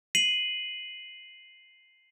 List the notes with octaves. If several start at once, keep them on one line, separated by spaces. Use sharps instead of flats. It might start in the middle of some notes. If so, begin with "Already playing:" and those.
C7 D#7 F#7